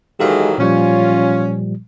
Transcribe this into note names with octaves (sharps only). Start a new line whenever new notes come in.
D#3 E3 F#3 G#3 G4 A4 F5
A#2 F3 G3 C#4 F4